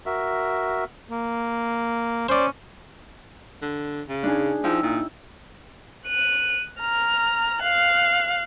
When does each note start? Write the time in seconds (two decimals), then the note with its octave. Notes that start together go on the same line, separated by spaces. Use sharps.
0.06 F#4 A#4 E5
1.11 A#3
2.29 C#4 C5 D5
3.62 D3
4.09 C#3
4.23 D4 D#4 G#4
4.64 F3 D#4 E4 G5
4.83 A#2
6.07 F#6 D#7
6.81 A#5 F6
7.62 F5 F#6